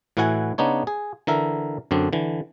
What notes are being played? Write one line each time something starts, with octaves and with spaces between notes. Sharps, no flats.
A2 E3 E4 F#4 F#5 G#5
C#3 B3 D4 D#4 C#5
G#4
D3 E3 A#4 E5
F#2 D3 C4 D4
D3 E3